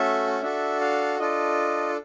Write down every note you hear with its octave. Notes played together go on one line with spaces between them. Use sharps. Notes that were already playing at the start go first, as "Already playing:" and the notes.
Already playing: A3 C#4 F#4 A4 E5
D4 F#4 A4 E5
F5
D4 F4 A4 D#5